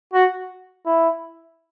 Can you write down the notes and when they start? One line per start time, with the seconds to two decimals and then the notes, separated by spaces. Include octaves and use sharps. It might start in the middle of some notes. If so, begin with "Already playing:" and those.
0.13 F#4
0.86 E4